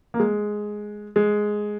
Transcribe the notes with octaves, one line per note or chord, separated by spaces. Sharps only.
A#3
G#3
G#3